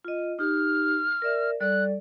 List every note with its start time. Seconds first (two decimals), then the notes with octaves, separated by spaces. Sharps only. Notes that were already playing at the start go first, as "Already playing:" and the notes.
0.05 F4 D#5
0.39 D#4 G4 F6
1.22 A#4 D5 E5
1.60 G3 A4 D5 F#6